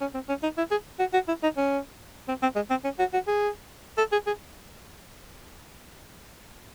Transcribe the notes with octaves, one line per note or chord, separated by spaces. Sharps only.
C#4
C4
C#4
D#4
E4
G#4
F#4
F#4
E4
D#4
C#4
C4
C4
G#3
C4
C#4
F#4
F#4
G#4
A4
G#4
G#4